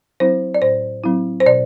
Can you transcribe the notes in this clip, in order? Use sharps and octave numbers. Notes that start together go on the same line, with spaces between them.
F#3 C4 E4 C5
D5
A2 C5
F#3 C4 E4
C5
B2 D5